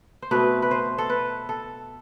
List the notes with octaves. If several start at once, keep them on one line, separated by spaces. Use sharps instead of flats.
C5
B2 A3 C4 B4
B4
C5
A4
B4
A4